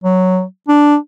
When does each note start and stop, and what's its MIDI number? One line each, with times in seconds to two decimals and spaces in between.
0.04 0.44 54
0.68 0.96 62